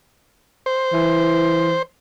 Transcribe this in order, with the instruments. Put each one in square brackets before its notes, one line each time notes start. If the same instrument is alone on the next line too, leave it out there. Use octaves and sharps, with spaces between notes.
[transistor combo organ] C5
[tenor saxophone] E3